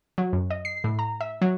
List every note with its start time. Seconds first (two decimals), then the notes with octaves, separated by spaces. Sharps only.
0.18 F#3
0.33 F#2
0.50 D#5
0.65 C7
0.84 A2
0.99 A#5
1.21 E5
1.42 F#3